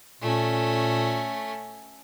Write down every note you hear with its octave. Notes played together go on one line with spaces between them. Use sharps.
A#2 A3 C#4